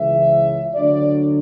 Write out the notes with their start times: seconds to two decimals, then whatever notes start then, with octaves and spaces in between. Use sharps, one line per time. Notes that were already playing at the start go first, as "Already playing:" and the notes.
Already playing: C#2 C#3 E3 E5
0.74 D2 D3 F#3 D5